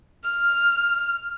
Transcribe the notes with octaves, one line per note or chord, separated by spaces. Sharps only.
F6